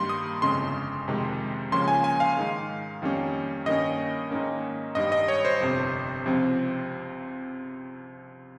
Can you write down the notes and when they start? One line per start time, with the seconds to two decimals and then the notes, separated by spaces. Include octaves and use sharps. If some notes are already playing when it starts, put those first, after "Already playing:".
Already playing: G2 D#3 G3 A#3 C6
0.09 D#6
0.42 G1 F2 C#3 G#3 C6
1.08 F2 C3 D#3 G#3
1.72 C#2 C#3 F3 A#3 C#4 C6
1.88 G#5
2.04 G#5
2.20 F5
2.37 G#2 D#3 G#3
3.02 F2 D#3 G3 A#3 C#4
3.66 G2 D#3 A#3 C#4 D#5
4.31 G#2 D#3 A#3 C#4
4.95 G#1 G2 D#3 G3 D#5
5.12 D#5
5.28 C#5
5.45 C5
5.60 G1 F2 C3
6.26 C#2 C3 F3 C4